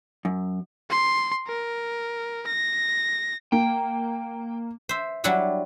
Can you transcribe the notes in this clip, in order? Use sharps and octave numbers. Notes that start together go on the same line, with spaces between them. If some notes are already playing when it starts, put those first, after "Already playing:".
F#2
C6
A#4
A#6
A#3 G5
C5 E5
F#3 G3 D4 E4 F#4